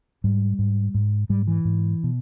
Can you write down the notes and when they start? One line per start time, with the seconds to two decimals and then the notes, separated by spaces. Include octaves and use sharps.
0.24 G#2 G3
0.59 G#2
0.94 G#2
1.29 G#2 G3
1.47 E3
1.65 G#2
2.04 B2